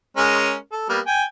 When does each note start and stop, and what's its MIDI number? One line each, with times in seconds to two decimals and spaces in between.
0.17 0.55 56
0.17 0.55 61
0.17 0.55 70
0.72 0.86 69
0.89 1.00 55
0.89 1.00 58
0.89 1.00 59
1.07 1.23 79
1.07 1.23 80